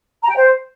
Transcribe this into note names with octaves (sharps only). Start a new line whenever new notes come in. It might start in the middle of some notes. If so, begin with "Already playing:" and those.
A#5
G5
C5